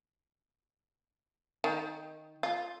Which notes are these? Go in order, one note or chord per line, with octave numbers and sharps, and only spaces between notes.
D#3
F4